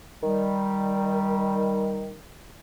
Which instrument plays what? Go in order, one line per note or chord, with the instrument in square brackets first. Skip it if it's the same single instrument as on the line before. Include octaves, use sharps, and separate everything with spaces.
[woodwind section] D#3 G3